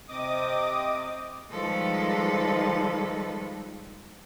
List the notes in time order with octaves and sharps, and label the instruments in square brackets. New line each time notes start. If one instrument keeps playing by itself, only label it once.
[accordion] C3 C4 D#5 D6 D#6
[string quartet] D#3 F3 G3 G#3 A4 B4